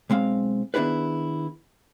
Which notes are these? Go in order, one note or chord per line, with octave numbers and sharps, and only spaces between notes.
B1 G#3 C4 F5
D#3 B3 D4 E4 G#4 B4